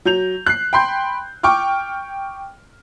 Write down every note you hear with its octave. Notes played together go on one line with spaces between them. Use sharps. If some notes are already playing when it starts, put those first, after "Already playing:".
F#3 G6 F7
F#6 C7
G5 B5 C6 G6
G5 C#6 D6 F6